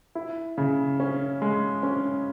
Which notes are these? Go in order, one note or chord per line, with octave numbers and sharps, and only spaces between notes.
E4
C#3
C#4
G#3
C#4